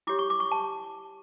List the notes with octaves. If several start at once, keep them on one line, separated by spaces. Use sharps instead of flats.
E4 G4 C#5 D6
C#6
D6
C#6
A5